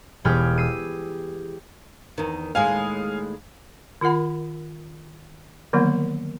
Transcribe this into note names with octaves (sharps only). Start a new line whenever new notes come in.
E1 G4 G#4 F6 G6
E6 C7 D#7
E2 D#3
D#2 A2 G#3 F5 G#5
D#3 F4 A#4 F#5 B5
D3 D#3 F3 F#3 A#3 B3